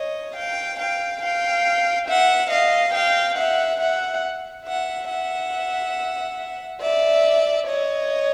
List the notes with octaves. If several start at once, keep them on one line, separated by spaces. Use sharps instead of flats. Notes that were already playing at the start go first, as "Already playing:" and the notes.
Already playing: C#5 D#5
F5 G5
F5 G5
F5 G5
E5 F#5
D#5 F5
F5 G5
E5 F#5
E5 F#5
E5 F#5
E5 F#5
D5 E5
C#5 D#5